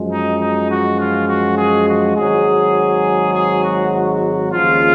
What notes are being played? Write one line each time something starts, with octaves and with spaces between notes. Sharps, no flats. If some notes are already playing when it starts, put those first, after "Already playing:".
Already playing: F#2 F3 G#3
D#4
D#4
F#4
F4
F#4
G#4
F#4
G#1 G#2 F#3 G#4
G#4
F#4
F#4
D#2 C#3 F3 G#3 F4